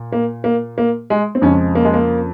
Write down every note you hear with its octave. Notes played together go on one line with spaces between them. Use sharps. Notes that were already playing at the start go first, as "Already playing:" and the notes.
Already playing: A#2
A#3
A#3
A#3
G#3
C4
F2 C#3 F3 G#3 C#4
A#3
G#3
A#3